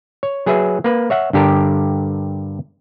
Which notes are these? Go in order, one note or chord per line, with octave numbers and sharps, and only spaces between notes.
C#5
F#3 G#4 B4 E5
A#3 B4
C#5 E5 F#5
G2 D3 G4 A4 A#4